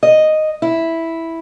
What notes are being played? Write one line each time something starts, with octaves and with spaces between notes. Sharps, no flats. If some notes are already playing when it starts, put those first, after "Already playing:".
D#5
E4